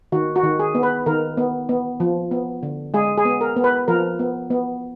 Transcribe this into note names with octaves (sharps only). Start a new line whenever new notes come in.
D#3 F#4
F#4
D#3
G#4
B3
B4
D#3 A#4
B3
B3
F3
B3
D3
G#3 G#4
G#4
B3
A#4
B3
B4
F3 A#4
B3
B3